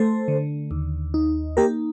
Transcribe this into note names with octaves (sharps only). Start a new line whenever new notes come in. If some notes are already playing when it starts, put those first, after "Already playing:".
Already playing: A3 A4 C5
D3
D#2
D#4
A#3 G4 A#4